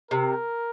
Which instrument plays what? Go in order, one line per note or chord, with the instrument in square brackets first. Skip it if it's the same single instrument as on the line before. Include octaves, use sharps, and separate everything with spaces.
[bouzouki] C3 [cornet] A#4